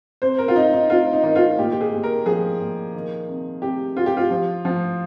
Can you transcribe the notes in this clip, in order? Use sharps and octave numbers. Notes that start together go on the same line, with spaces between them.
C3 C5
A#4
F4
C3 D#4
D#4
C3 F4
D#4
D#3 D#4
F4
A#2 G4
G4
G#4
A#2
A#4
F3 G#4
A#2
D#3
C3
C3 G4
C3 F4
G4
F4
F3
F3